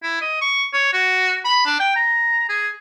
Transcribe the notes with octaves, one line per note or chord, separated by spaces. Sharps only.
E4
D#5
C#6
C#5
F#4
B5
D4
G5
A#5
G#4